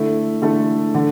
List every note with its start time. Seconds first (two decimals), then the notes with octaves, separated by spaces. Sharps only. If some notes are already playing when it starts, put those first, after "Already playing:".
Already playing: D3 A3 E4 A4
0.42 D3 A3 E4 A4
0.94 D3